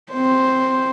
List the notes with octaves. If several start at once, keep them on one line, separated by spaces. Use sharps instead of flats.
C4 C5